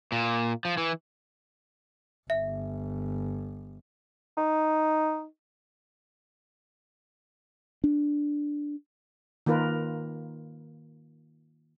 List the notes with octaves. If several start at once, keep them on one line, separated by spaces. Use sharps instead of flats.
A#2
F3
E3
G1 E5
D#4
D4
D#3 A#3 F4 A#4 B4